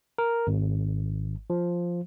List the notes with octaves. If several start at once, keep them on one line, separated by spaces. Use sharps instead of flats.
A#4
G#1
F3